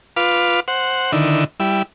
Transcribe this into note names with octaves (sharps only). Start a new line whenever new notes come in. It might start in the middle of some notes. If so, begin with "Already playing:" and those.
F4 B4 F5 D6
C5 F#5
D3 D#3 E4
G3 E4